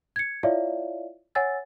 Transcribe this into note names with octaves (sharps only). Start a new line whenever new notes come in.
G#6 C#7
E4 F4 C#5 D5 E5 F5
C#5 F#5 G#5 E6 A6